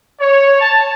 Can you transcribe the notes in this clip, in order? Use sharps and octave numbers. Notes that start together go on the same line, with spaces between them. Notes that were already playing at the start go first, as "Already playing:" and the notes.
C#5
A5